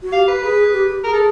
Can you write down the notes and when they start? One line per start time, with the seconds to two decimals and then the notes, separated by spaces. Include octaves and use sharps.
0.03 F#4
0.12 G4 F5
0.28 B4
0.43 G#4 B4
0.73 G4
0.88 G4
1.03 G#4 A#4
1.13 A4